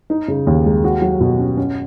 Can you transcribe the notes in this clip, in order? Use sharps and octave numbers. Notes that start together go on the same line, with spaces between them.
D#4
C#3
D#2
G#3
F#4
F#3
B2
C#4
C#4